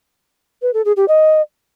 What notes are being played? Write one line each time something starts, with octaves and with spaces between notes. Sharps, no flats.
B4
A4
G#4
G4
D#5